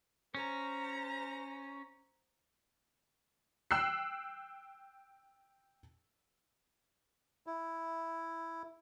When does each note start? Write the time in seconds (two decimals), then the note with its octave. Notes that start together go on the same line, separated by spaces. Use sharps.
0.35 C#4 C5 A#5
3.71 G5 E6 F#6 C7
7.47 E4